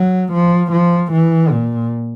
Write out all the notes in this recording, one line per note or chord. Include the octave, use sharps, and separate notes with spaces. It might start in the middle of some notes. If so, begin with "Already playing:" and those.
Already playing: F#3
F3
F3
E3
A#2